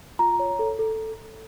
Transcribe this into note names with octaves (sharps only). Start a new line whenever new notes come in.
F4 A#5
C#5
A4
A4